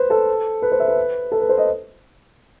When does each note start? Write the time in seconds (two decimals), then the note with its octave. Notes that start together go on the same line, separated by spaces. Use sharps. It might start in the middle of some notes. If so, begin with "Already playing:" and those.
Already playing: B4 C5
0.10 A4
0.62 B4
0.72 C5
0.80 E5
0.88 B4
1.32 A4
1.41 B4
1.49 C5
1.58 D#5